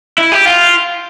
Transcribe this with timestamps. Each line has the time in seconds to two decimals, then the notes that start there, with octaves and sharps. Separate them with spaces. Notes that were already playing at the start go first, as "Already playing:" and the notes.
0.18 E4
0.32 G4
0.46 F4